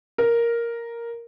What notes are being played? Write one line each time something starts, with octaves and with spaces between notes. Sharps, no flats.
A#4